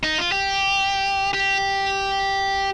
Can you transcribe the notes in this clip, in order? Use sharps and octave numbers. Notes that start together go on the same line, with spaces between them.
D#4
F4
G4
G4